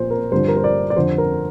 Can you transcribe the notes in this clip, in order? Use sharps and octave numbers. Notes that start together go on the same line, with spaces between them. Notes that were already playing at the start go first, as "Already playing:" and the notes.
Already playing: A#2 F3 C5
A#4
G2 D3 F3 C5
A#4
C5
D5
D5
F2 D3 F3 C5
A#4